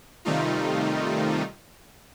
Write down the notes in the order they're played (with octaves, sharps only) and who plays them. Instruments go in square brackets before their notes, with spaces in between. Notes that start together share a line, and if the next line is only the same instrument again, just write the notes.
[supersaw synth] C3 D#3 G3 A3 D#4 F4